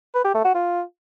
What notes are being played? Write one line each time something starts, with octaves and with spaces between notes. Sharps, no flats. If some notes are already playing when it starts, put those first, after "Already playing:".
B4
G4
A3
F#4
F4